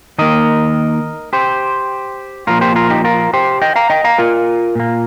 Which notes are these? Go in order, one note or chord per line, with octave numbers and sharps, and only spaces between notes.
D#3 A#3 A#4 D#5
G4 C5
A#2 F3 A#3 F4 A#4
G4 C5
F4 A#4
D#4 G4
F4 A#4
G4 C5
D#5 G5
F5 A#5
D#5 G5
F5 A#5
F4 A#4
A#2 A#3